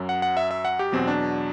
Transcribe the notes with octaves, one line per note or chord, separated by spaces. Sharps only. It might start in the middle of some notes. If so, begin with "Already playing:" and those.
Already playing: F#2 F#3
F#5
F#5
E5
E5
F#5
G4
E2 B2 F#3 C4
D4